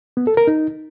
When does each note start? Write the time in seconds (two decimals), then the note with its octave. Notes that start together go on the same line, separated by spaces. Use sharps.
0.17 B3
0.27 A4
0.37 A#4
0.47 D#4